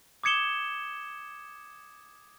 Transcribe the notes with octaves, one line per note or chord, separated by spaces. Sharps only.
D6 D#6 G#6 C#7 E7 G7